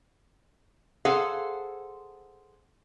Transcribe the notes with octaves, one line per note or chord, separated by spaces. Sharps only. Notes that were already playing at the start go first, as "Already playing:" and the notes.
G#4 A4 C5 F5 F#5